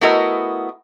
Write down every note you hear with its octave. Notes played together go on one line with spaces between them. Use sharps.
A3 B3 E4 F#4 A#4 D#5